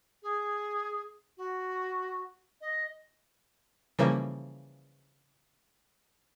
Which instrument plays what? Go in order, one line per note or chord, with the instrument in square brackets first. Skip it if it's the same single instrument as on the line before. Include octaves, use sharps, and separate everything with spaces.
[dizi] G#4
F#4
D#5
[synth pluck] C#3 E3 F3 G3 A#3